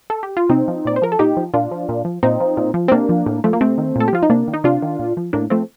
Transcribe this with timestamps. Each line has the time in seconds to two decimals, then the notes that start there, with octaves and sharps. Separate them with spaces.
0.10 A4
0.23 G4
0.37 F4
0.49 C3 C4 D#4
0.68 F3
0.85 A#2 D5
0.96 C5
1.02 F3 A#4
1.12 A4
1.19 A#2 D#4 G4
1.37 F3
1.54 A#2 D4 F4
1.71 F3
1.89 A#2
2.05 F3
2.23 A#2 C4 D#4
2.40 F3
2.57 A#2
2.74 F3
2.88 C4
2.91 C3 A#3 D4
3.09 F3
3.26 A2
3.44 F3 A3
3.53 A#3
3.61 C3 A3 C4
3.78 D#3
3.96 A#2 A4
4.08 G4
4.13 F3 F4
4.23 D#4
4.30 C3 A#3 D4
4.48 D#3
4.53 D#4
4.64 C3 D4 F4
4.82 D#3
4.99 A#2
5.17 F3
5.33 A2 A#3 D4
5.50 F3 A3 C4